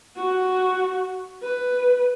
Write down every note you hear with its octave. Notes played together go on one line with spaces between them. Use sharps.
F#4
B4